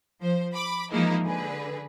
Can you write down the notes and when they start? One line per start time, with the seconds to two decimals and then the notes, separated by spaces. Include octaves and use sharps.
0.20 F3 C5
0.54 B5 D6
0.92 E3 F3 G#3 A#3 D#4 E4
1.24 D3 G#4 B4